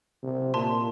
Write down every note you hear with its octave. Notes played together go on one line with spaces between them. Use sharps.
C3
A#2 A5 C6